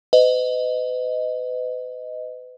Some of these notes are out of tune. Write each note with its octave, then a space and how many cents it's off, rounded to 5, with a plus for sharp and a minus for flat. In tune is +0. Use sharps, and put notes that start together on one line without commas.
B4 +40 D#5 +0